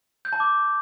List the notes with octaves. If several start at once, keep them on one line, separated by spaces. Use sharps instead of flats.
G6
A5
D6